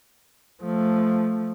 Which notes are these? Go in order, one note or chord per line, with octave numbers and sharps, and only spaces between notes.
F3 A3